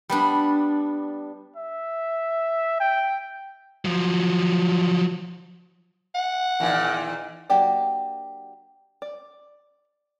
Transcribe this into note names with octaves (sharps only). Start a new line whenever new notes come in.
G3 B3 D4
E5
G5
F3 F#3
F#5
E2 A#2 D#3
F#3 A#3 D4 G4 D5
D5